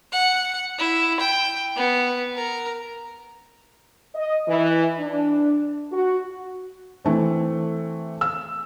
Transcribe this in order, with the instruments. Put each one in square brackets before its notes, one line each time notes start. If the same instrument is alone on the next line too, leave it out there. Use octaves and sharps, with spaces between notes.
[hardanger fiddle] F#5
E4
G5
B3
A#4
[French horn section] D#5
E3
D4
F#4
[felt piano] E3 A3 C4
E6